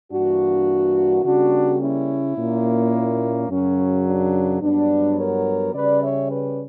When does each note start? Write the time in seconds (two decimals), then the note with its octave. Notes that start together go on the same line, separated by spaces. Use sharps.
0.12 G2 E3 A#3 D4 F#4
1.24 C#3 G3 A#3 D4 F#4
1.80 C#4 E4
2.37 A#2 A#3 C#4
3.49 F#2 C#3 F#3 C#4
4.06 D4
4.62 G2 F#3 B3 D4
5.18 A#4 C#5
5.73 C#3 G3 C#4 B4 D5
6.02 C#5 E5
6.30 B4 D5